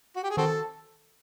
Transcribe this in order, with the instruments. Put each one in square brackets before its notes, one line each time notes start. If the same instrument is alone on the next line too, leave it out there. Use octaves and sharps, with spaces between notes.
[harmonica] F#4
G4
G#4
[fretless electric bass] D#3 [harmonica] C4 F#4 A4